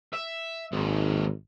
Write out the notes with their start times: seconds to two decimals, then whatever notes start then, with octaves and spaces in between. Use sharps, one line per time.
0.13 E5
0.72 G#1 D#2 G#2